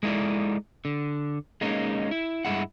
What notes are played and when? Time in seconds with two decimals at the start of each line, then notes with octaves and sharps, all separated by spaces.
0.03 G#3 A3 D#4 E4 A4 D5
0.85 D3
1.61 G#3 A#3 C#4 D#4
2.11 E4
2.45 G2 G3 G#3 E4 F#5